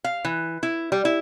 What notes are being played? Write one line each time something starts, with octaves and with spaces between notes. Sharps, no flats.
F5
E3
E4
G3
E4